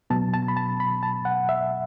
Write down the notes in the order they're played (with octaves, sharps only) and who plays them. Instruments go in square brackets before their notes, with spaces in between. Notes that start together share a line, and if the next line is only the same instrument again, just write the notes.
[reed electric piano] B2 F#3 B3 A5
A5
B5
A5
B5
A5
F#5
E5